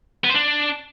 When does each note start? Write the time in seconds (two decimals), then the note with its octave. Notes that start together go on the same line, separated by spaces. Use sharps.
0.24 B3
0.30 C5
0.35 D4